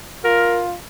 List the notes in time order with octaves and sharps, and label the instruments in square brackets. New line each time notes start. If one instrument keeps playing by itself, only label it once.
[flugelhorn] F4 [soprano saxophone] A#4